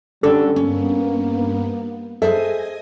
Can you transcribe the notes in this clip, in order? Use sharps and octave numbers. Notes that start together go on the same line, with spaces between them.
D3 G3 C#4 D4 A4
G2 A#3 B3 C#4
G#4 A4 C5 D#5 E5 G#5 D#6